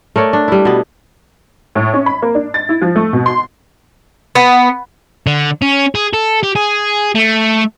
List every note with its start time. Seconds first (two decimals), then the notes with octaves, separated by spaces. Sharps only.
0.16 A3 A#4 C#5 D5
0.33 D4
0.48 G3 E4
0.65 B2 B3
1.75 A2
1.94 C#4
2.06 B5
2.22 A#3
2.35 D4
2.54 A6
2.69 E4
2.81 F3
2.96 A3
3.13 B2
3.26 C6
4.35 B3
5.27 D3
5.62 C#4
5.95 G#4
6.14 A4
6.43 G4
6.55 G#4
7.15 A3